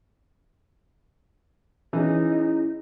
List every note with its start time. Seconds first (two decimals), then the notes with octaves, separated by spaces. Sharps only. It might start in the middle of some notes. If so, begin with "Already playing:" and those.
1.93 E3 C#4 D#4 E4 G#4